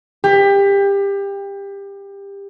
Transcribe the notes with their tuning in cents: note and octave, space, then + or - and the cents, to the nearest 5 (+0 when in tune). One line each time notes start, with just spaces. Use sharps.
G4 +25